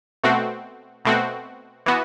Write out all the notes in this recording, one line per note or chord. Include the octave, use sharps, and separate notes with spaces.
B2 A3 C4 F#4
B2 A3 C4 F#4
E3 B3 F#4